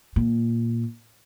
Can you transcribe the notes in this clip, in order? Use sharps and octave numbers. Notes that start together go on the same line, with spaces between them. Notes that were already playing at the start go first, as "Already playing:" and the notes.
A#2